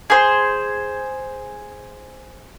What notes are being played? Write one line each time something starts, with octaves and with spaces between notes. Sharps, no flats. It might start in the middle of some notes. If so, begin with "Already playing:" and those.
G#4 C5